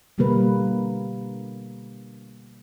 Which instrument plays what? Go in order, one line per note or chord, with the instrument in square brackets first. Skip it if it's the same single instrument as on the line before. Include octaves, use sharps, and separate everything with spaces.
[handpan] B2 D3 G3 A#3 A#4 B4